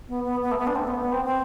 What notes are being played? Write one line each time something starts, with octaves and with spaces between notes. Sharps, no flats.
B3
B3
B3
A3
B3
D4
C4
A3
B3
B3
C4
C4